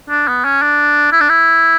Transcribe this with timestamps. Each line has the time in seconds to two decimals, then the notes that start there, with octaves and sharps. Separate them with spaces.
0.10 D4
0.28 B3
0.45 C#4
0.62 D4
1.12 E4
1.21 D4
1.29 E4